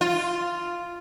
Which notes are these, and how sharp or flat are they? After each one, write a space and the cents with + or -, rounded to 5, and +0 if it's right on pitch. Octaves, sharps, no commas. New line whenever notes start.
F4 -5